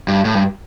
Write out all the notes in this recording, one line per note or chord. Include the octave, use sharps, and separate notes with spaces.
G2
A2
G2